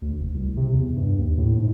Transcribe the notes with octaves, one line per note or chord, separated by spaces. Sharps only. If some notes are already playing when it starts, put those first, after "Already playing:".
D2
F1
C2
C3
E2
G2
D#2
A2
G#2